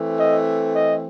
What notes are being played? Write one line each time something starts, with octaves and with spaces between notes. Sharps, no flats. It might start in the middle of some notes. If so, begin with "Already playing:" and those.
Already playing: E3 A3 C4
D#5
D#5